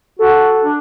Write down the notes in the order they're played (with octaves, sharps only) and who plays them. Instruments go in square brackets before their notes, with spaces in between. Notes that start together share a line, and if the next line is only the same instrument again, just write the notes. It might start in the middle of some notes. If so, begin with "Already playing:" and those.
[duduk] F#4 [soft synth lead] A4
[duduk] D4